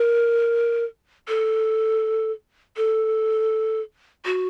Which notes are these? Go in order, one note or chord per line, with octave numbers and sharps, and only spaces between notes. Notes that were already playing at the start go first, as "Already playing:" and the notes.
Already playing: A#4
A4
A4
F#4